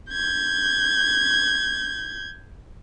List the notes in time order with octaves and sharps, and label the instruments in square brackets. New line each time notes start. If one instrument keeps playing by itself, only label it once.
[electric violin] G6 G#6